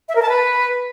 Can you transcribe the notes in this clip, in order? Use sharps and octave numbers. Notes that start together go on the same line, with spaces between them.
E5
A#4
A5
B4